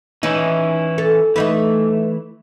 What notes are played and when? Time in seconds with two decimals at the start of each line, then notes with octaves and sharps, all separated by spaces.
0.23 E3 C#4 D#4 E4
0.98 A4
1.36 E3 A3 D#4 B4